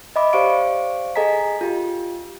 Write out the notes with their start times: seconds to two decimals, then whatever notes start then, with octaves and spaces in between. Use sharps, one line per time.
0.16 D#5 E5 B5 D6
0.33 G4 C5 D5 F5 C#6 D7
1.16 G#4 A4 D#5 G#5 A#5 B6
1.61 F4 G4